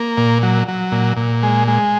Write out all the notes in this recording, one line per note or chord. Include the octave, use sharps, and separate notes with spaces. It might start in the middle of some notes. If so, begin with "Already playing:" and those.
Already playing: A#3
A#2
F#3
F#3
A#2
A#2
G#3
G#3